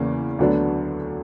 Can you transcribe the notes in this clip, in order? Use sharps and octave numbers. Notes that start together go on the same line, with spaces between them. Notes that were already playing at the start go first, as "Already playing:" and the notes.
Already playing: E2 C#3 E3 A#3 C#4
D2 D3 F#3 B3 D4